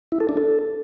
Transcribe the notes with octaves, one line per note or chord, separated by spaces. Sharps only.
E4
A4
D4
A4